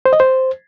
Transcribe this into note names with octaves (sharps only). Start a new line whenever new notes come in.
C5
D#5
C5